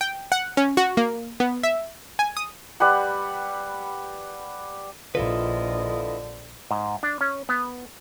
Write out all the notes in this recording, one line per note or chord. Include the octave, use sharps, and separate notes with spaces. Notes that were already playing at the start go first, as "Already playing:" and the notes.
G5
F#5
C#4
F#4
A#3
B3
E5
G#5
D#6
G3 B4 F#5
A#1 D3 E4 F4 A4 B4 D#5
G#2
D4
C#4
B3